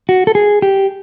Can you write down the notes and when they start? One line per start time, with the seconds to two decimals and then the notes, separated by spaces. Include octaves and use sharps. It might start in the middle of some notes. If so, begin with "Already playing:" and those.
0.09 F#4
0.27 A4
0.35 G#4
0.62 G4